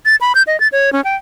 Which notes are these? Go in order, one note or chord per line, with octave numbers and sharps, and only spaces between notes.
A6
B5
G6
D#5
A6
C#5
C#4
G5